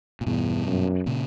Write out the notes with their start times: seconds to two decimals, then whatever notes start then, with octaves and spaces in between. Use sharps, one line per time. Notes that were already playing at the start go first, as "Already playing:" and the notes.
0.21 A#2
0.26 E2 G2 B2
0.67 F#2
1.06 A#2 C#3